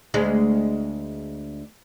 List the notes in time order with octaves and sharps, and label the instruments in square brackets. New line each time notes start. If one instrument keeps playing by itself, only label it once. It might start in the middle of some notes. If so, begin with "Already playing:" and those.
[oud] D2 G#3